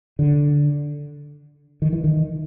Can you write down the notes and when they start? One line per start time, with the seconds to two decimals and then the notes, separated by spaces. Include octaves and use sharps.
0.19 D3
1.82 D#3
1.93 E3
2.04 D#3